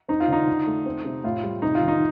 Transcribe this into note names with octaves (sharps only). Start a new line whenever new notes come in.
C4 D#4
F4
D3 D#4
D3
A3
C4
C3
A2 F4
G3
C3 D#4
F4
D#3
D#4